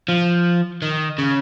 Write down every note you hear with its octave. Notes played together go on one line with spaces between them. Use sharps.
F3
D#3
C#3